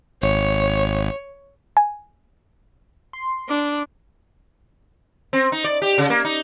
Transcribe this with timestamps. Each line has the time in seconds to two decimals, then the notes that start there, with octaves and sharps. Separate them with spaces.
0.22 G#1 C#5
1.77 G#5
3.13 C6
3.49 D4 D6
5.33 C4
5.52 D#4
5.64 D5
5.82 G4
5.98 C#3
6.10 A#3
6.25 D#4